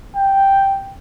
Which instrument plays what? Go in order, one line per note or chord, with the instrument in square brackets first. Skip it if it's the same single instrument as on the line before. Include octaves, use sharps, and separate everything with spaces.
[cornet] G5